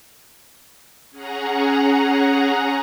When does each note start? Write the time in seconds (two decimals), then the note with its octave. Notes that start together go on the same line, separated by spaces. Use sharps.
1.11 C#4 G#4 F#5 A#5